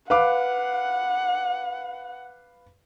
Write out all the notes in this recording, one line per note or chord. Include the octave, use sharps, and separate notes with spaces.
B4 F5 F#5 D6